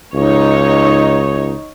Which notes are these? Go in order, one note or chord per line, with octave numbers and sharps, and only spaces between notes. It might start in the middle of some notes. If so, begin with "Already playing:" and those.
C#2 D#4 C#5